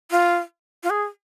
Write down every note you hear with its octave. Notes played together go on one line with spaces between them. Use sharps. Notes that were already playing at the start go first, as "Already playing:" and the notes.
F4
F4
G#4